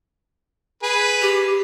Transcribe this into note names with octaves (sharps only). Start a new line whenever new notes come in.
G#4 B4
G4